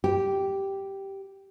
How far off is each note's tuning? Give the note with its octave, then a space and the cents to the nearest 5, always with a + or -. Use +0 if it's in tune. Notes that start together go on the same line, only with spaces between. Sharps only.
G4 -5